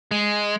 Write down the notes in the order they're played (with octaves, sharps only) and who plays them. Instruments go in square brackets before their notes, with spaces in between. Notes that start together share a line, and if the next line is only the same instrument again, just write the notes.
[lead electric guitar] G#3